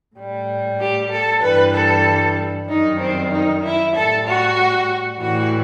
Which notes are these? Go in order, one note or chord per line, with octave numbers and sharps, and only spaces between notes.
A2 G3
G4
A4
G2 E3 G3 B4
A4
F#2 D#3 G3 D#4
C4
D#4
E4
A2 G3 A4
F#4
A2 E3 G3 F#4